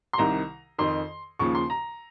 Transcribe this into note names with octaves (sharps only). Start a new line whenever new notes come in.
C6
C2 C3 D#3 A#5
F2 D#3 C6
D#2 C#3 F3 C#6
C6
A#5